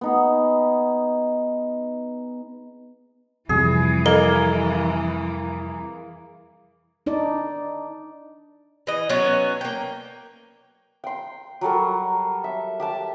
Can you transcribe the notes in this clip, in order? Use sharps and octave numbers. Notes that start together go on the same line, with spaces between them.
B3 D#4 G#4
F2 C3 E3 G3 G#4
A#3 A4 D#5 G7
D4 D#4 D5
E3 D#5
F#3 B3 C#4 C#5
A#3 G5
G5 C6
F#3 G3 A4 A#4
E5
G4 G5 A5